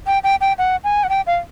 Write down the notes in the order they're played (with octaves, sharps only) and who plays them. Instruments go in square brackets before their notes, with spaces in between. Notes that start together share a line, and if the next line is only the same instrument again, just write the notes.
[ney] G5
G5
G5
F#5
G#5
F#5
G5
F5